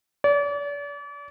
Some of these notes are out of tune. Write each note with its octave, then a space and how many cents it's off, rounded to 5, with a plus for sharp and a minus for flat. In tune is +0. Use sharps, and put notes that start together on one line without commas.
D5 -40